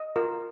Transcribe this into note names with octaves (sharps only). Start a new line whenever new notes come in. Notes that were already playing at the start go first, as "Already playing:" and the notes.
Already playing: D#5
F4 A#4